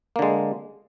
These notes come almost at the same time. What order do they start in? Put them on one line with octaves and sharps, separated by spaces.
A#3 D3 G#3